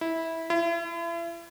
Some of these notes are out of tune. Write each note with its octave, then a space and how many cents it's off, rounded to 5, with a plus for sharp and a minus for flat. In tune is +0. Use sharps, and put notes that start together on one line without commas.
E4 -15
E4 +40